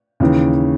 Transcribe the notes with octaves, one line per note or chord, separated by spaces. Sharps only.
D#2 C#3 E3